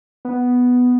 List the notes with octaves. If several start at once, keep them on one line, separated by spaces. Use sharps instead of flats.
B3